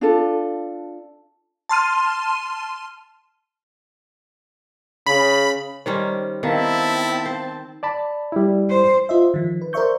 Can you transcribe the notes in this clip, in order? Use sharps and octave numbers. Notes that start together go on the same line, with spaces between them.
D4 F4 A4
A5 C6 F6 D#7
C#3 B5
D#3 G3 C#4 C5
D#3 B3 C4 E4 F5 A5 B6
C5
D5 A5 B5
G3 E4
C5
F4 C5 D#5 E5
D#3 F3
B4
A#4 C5 D5 E5 C#6 G6